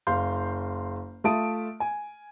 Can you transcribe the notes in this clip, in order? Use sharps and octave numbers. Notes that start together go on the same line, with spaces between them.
F#1 F5 C6 G6
A3 F4 E5 A5 D#6 D7
G#5